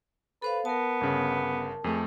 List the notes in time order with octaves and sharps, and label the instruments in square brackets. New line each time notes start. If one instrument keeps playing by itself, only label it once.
[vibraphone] A4 C5 F5 [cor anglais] B4
[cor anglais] B3 [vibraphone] A#4 A5
[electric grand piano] G1 C#3
[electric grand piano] F2 A3 [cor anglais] G#4